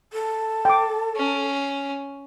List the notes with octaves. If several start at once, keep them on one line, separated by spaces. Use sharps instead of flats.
A4
G5 D6
C#4